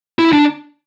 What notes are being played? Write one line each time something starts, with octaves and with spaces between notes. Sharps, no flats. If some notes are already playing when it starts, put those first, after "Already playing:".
E4
D4